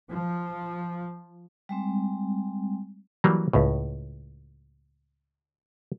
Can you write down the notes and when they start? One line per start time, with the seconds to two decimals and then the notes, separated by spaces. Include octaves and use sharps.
0.11 F3
1.69 G3 G#3 C4
3.24 E3 F#3 G3 A#3
3.53 C#2 A2